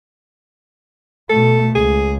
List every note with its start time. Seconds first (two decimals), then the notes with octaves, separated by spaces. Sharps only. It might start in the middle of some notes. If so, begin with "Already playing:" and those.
1.30 B2 A3 A4
1.75 C#2 G#4